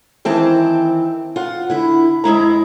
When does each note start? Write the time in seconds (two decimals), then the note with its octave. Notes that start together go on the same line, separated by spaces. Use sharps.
0.25 D#3 E3 C4 C5 A5
1.36 F4 F#5
1.70 D3 E4
2.24 F2 G#3 E4 A#5